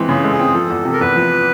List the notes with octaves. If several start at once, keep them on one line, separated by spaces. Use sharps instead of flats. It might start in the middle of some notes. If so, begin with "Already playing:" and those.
Already playing: E3 G#3 C4
C#3 G#4
G#3 A4
G#4
C4
F3 A4
E2
C3
A#4
E2 B4
F3